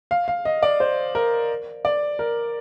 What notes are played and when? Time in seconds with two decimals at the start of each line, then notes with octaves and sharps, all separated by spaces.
0.11 F5
0.28 F5
0.45 D#5
0.63 D5
0.80 C5
1.15 A#4
1.85 D5
2.19 A#4